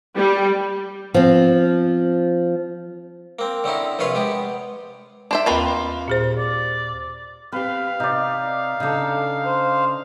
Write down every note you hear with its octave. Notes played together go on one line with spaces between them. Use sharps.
G3
F3 C4
A#3 C4
D3 C4 C#4 D#4 E4
A#1 C3 F4 B4 C#5 C6
G#3 B3 G4
D4 C5 E5
D#2 A#3 F4 B4 G5
A#2 G#4 C5
D5
C4 G4 B4 F5
C3 D#4 D5
C#3 D4 D#4 A4
C5